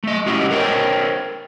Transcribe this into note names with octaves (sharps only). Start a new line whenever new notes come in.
A3 D#5
G#3 C#4 E4 F#4 G4 D#5
A#4 C5 C#5 G5